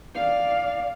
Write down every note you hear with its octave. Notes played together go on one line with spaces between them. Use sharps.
D5 F5